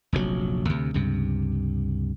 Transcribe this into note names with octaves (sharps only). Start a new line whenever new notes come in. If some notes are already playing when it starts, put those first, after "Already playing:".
F1 A#1 G#2 F#3
D2 C3
C#2 G2 C3